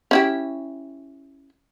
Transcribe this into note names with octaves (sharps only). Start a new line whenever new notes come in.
C#4 E4 G4